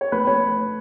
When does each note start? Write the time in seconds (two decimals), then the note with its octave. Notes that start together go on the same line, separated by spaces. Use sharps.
0.01 C#5
0.12 A3 B4
0.27 A3 C#5